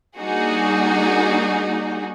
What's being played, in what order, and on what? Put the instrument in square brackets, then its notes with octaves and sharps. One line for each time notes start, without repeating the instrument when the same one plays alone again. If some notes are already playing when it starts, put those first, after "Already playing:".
[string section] G3 A#3 D4 D#4 F#4 G#4